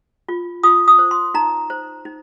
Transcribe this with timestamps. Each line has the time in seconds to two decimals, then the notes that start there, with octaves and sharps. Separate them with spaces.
0.29 F4
0.63 F4 D#6
0.88 D#6
0.99 C5
1.11 C6
1.34 D#4 A#5
1.70 C5
2.05 D#4